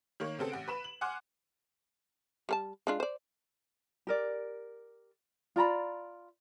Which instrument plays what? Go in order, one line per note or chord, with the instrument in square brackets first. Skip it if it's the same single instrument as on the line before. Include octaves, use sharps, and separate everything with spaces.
[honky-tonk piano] D#3 A#3 C#5
C#3 B3 C4 A4
A1 F#5 D7
B4 B5 E7
F#7
F#5 G#5 C6 D6 F6 F#6
[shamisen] G3 A#4 A5
G#3 D4 F4
C5 D5
[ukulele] G4 A#4 D5
F4 D5 A#5 B5